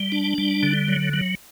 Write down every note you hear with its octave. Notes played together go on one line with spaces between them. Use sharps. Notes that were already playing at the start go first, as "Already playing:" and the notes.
Already playing: G3
D4
G3
D3
F#3
F#3